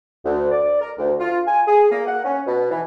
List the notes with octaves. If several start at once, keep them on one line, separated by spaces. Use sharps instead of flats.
D2
D5
A#4
D2
F4
G#5
G#4
A#3
F#5
C#4
B2
E3